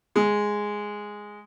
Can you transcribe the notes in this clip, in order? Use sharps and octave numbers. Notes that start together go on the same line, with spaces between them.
G#3